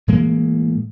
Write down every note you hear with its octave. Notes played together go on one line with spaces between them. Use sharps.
A2 E3 G#3 A#3